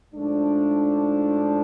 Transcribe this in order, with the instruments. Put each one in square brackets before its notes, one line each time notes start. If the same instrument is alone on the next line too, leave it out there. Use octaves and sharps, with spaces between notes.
[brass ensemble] G#2 F3 A3 D4